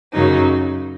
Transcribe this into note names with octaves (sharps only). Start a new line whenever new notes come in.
F#2 C#3 F#3 A#3 D#4